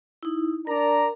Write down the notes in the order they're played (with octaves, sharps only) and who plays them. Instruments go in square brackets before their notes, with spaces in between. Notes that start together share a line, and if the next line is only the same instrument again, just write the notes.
[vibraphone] D#4 E4
[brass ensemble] D4 D5 A#5 [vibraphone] A#4